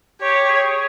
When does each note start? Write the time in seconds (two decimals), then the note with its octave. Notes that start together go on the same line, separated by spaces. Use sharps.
0.21 G4 C#5
0.49 G#4